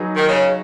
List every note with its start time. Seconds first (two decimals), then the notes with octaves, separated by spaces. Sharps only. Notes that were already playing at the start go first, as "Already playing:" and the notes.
Already playing: F#3 D#4 G#4 B4
0.16 D#3
0.28 C#3